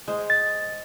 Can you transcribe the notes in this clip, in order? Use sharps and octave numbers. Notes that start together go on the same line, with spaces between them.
G#3 C5
A6